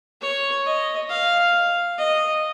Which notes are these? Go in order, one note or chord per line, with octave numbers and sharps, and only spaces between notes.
C#5
D#5
F5
D#5